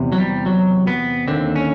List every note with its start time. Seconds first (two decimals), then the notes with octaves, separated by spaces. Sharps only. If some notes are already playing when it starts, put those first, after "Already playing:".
Already playing: E2 C3
0.12 F#3
0.18 G3
0.46 F#3
0.87 B3
1.28 D#2 D3 C4
1.56 C#4